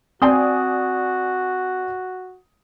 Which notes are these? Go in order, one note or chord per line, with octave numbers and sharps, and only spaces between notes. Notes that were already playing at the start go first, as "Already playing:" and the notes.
C4 F#4 D5 G#5 C6 D#6